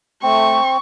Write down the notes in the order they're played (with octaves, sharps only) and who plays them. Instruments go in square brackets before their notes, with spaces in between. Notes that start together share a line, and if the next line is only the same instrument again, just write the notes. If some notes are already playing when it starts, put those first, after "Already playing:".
[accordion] A3 [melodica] C4 [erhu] C#6